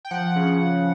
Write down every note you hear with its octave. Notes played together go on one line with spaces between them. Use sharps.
G5
F3 F#5
C#3